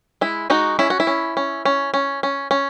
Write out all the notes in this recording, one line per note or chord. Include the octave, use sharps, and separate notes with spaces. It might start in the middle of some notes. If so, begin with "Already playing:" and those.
G#3 E4
G#3 D#4 F#4
C#4 E4
F#4
E4
C#4
C#4
C#4
C#4
C#4
C#4